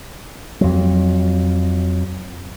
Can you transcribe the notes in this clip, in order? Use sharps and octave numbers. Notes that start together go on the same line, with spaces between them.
F2 F#3